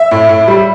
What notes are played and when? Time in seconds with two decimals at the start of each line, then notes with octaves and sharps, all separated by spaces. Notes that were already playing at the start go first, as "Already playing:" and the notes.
Already playing: E5
0.11 A2
0.29 A2
0.48 G3